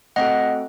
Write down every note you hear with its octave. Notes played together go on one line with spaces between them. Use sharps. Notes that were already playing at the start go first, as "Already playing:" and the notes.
A3 C4 F#4 A4 D#5 F#5